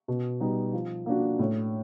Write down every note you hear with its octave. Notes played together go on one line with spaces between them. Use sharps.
B2
G3 B3 D#4
F3
A#3 D4 F#4
A2